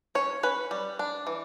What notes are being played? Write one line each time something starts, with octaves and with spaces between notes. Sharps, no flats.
C#4 C#5
C#4 B4
G3
D4
E3